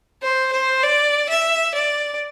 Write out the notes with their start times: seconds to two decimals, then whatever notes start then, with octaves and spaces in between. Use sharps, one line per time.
0.22 C5
0.53 C5
0.83 D5
1.29 E5
1.75 D5